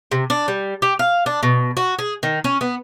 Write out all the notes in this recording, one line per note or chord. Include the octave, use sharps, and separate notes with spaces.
C3
D4
G3
G4
F5
D4
B2
F#4
G#4
D#3
C#4
B3